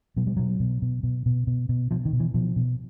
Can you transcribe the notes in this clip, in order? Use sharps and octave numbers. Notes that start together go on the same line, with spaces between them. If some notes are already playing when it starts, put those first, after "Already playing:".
B2 F#3
G3
B2 F#3
B2
B2
B2
B2
B2
B2
B2 F3
D#3
B2
E3
B2 F3
B2